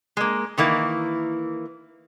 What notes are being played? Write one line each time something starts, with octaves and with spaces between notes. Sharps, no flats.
G#3 A#3
D#3 E3 A#3 E4